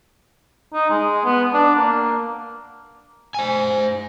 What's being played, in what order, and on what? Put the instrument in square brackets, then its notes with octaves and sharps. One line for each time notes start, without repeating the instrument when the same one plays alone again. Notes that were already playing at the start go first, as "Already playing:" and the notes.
[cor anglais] D#4
G#3
B3
D4
A#3
[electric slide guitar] C5 G#5